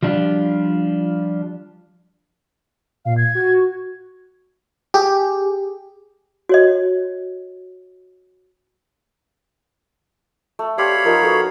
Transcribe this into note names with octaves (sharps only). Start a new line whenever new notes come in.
F3 G3 D4 F4
A#2 F5
G#6
F#4
G4 G#4
F#4 C#5 D#5
A3
C4 G4 C#5 D5 F5 B5
F3 D#4 A#4 F#5
B3 F#4 G#4 A4